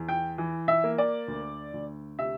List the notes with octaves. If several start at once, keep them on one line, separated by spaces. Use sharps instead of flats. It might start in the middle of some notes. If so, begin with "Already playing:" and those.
Already playing: E2
G5
E3
E5
A#3
D5
D2
D2
C3 E5